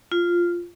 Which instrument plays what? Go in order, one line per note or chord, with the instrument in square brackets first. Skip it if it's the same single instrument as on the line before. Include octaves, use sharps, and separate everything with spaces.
[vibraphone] F4